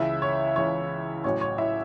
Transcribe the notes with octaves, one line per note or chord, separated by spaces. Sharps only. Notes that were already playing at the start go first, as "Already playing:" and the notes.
Already playing: C#2 C#3 E3 E4 E5
C#5
C#2 C#3 E3 C#5
A1 A2 F#3 C#4 C#5
C#5
E4 E5